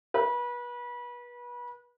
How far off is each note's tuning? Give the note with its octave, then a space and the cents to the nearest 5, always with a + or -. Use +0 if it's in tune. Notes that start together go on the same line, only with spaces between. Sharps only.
B4 -30